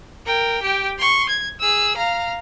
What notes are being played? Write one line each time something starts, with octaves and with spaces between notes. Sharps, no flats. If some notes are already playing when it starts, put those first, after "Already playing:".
A#4 G5
G4 G5
C6 C#6
G#6
G#4 E6
F5 A#5